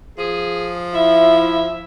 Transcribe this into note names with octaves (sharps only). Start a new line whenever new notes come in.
F3 G#4
E4 E5